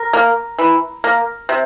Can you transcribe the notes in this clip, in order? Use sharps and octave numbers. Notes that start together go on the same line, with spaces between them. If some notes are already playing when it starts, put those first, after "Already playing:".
Already playing: A#4
A#3
E3
A#3
C3